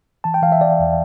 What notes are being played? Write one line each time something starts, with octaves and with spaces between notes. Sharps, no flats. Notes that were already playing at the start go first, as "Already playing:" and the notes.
E3 A5
G5
E3 F5
E5
E3 D5
E2